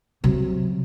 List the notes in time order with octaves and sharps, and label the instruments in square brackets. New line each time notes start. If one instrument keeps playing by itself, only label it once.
[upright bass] C3 F#3